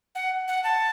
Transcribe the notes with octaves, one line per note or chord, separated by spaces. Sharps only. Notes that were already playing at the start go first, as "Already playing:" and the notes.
F#5
F#5
A5